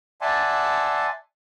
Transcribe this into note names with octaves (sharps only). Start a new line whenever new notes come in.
D5 E5 F#5 G#5 A5 C6